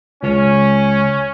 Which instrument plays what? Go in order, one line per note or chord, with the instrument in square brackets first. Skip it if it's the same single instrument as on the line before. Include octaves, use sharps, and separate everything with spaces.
[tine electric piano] C#2 [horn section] C#4